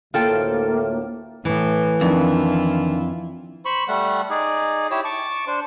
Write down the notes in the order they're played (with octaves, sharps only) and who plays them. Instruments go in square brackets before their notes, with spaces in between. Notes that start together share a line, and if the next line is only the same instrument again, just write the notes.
[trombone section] D2 A2 [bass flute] A#3 [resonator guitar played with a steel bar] F4 A4 G5
[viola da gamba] A2 [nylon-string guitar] E3
[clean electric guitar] F2 [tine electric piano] D#3 D4 [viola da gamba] E4 F4
[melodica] C5 B5 C#6
G3 A3 F#5
D#4 G#4 D5
E4 G4 C#5
A5 C#6 D6
D4 C5